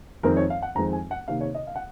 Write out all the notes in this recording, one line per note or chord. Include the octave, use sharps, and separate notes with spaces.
F2 D#3 G#3 C4 A#4
C#5
F5
F#5
F2 D#3 G#3 C4 A#5
G#5
F#5
C3 D#3 A#3 F5
C#5
D#5
F5
F#5